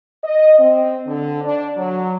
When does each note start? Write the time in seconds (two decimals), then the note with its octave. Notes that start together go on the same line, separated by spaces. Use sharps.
0.23 D#5
0.59 C4
1.06 D3
1.43 D4
1.76 F#3